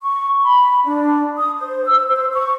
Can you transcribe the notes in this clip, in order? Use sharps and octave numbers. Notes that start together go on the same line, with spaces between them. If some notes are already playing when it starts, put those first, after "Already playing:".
C#6
B5
D4
D#6
C5
E6
C5
C#6